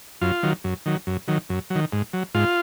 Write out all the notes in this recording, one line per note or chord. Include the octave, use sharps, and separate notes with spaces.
F#2 F4
D#3 F#3
F#2
D#3 F#3
F#2
D#3 F#3
F#2
F#3
D#3
G#2
F#3
G#2 F4